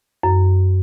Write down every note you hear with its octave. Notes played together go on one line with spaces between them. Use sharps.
F#2